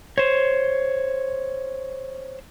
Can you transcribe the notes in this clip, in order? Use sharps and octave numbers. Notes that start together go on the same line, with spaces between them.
C5 C#5